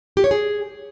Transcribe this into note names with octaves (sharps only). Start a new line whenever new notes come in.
G4
C#5
G#4